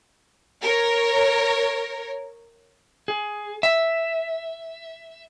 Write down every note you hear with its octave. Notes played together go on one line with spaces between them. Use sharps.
A#4 C#5
G#4
E5